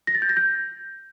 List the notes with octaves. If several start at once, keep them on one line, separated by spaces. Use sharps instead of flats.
A#6
A6
G6
A#6
G6